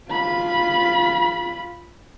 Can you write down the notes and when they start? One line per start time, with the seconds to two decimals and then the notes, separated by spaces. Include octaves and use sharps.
0.11 F4 B5